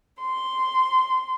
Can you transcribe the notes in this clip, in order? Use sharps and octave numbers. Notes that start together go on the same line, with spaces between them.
C6